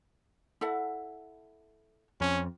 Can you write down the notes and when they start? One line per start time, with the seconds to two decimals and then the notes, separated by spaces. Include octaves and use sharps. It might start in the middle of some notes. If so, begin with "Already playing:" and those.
0.61 E4 A4 F#5
2.21 F2 C#4